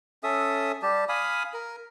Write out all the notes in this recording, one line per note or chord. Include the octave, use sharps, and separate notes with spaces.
C#4 A4 E5 D#6
G3 G4 A5
F5 G#5 B5 D#6
A#4